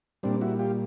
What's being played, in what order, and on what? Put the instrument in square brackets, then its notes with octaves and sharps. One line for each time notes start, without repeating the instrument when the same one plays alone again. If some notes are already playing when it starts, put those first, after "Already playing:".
[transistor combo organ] A#2 G3 C4 D4
E4 F#4
F4 G4